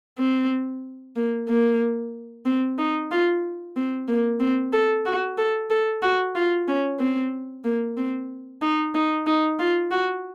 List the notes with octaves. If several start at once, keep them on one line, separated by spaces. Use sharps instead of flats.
C4
A#3
A#3
C4
D#4
F4
C4
A#3
C4
A4
F#4
A4
A4
F#4
F4
C#4
C4
A#3
C4
D#4
D#4
D#4
F4
F#4